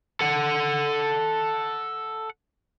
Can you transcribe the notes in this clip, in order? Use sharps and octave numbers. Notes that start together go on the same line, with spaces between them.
A4 F#5